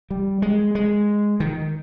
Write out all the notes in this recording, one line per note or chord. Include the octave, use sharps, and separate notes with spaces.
G3
G#3
G#3
D#3